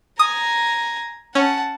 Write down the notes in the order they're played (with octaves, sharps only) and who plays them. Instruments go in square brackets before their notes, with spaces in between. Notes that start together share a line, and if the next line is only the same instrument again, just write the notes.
[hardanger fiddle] G#5 A#5 [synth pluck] D#6
[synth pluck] C#4 [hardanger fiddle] F#5 A5